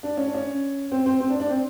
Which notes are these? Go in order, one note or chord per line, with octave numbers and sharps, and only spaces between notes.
D4
C#4
D4
C#4
C4
C4
C4
D4
D4
C4